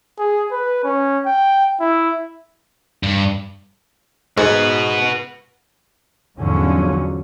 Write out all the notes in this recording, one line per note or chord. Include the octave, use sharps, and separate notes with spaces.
G#4
B4
C#4
G5
E4
G2
G#2 F#4 B4
E2 G#2 D3 F3 F#3 C#4